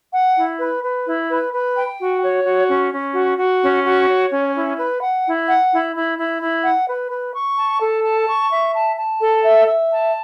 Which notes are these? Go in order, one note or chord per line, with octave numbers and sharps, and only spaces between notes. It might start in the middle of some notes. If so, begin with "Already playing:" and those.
F#5
E4
B4
B4
E4
B4
B4
G5
F#4
C#5
F#4
C#4
C#4
F#4
F#4
C#4
F#4
C#5
C#4
E4
B4
F#5
E4
F#5
E4
E4
E4
E4
F#5
B4
B4
C#6
A5
A4
A5
C#6
E5
A5
A5
A4
E5
E5
A5